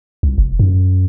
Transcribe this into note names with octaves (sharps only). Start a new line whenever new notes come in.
C2
F1
F#2